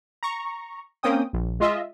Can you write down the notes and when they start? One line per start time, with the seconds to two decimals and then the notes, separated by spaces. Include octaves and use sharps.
0.23 A#5 C#6
1.03 A#3 C4 C#4 G5 D#6
1.33 A#1
1.60 G#3 F4 D#5 E5